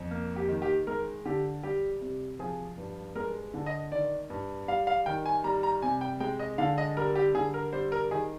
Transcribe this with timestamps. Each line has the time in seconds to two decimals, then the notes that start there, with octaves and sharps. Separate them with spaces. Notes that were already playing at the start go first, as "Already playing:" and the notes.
Already playing: F2
0.11 A#3
0.36 G4
0.49 D#3
0.62 G4
0.87 G#3 A#4
1.26 D3 G4
1.63 G3 G4
2.01 C3
2.39 F3 G#4
2.78 G2
3.15 G#3 A#4
3.54 D3
3.66 D#5
3.92 D#3 D5
4.30 G2
4.68 G3 F5
4.87 F5
5.06 D#3 G5
5.26 G#5
5.44 G3 A#5
5.63 A#5
5.82 C3 G#5
6.01 G5
6.20 G#3 G5
6.39 D#5
6.58 D3 F5
6.78 D#5
6.97 G3 A#4
7.15 G4
7.34 D3 G#4
7.54 A#4
7.73 G3 C5
7.92 A#4
8.11 D#3 G#4